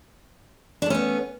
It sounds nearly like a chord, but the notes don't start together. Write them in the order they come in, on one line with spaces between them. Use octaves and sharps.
D4 A3 C#4 B3